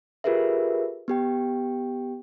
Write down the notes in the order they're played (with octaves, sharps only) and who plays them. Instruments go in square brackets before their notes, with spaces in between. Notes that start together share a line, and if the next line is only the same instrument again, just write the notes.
[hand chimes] F4 G4 G#4 A#4 B4 E5
B3 G4 G5